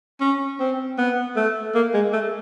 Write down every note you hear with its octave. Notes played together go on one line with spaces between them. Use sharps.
C#4
C4
B3
A3
A#3
G#3
A3